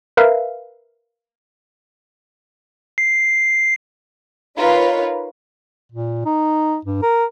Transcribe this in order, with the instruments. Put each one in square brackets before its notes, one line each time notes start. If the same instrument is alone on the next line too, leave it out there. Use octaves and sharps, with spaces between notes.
[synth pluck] A#4 B4 E5 F5
[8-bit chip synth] C7
[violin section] D#4 F4 A#4 B4 C#5 F5
[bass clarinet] A#2
D#4
G2
A#4